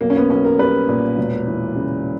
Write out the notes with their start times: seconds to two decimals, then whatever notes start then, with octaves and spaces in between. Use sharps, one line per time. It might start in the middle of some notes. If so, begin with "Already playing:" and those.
0.01 B1 A#3
0.10 C#4
0.16 B3
0.30 B1 C#4
0.45 A#4
0.59 G3 B4
0.88 A#2
1.18 E1
1.47 E3
1.76 C#3